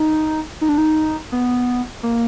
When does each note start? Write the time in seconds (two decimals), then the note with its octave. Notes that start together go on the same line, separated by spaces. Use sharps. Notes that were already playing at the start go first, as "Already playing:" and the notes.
Already playing: D#4
0.61 D#4
0.69 D4
0.78 D#4
1.32 B3
2.03 A#3